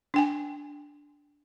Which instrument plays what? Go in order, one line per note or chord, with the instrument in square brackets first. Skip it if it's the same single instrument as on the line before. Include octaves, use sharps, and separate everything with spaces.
[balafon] D4 G5 G#5